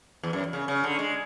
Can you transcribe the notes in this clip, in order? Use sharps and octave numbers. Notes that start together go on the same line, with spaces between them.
E2
F#2
C#3
C#3
D3
G#3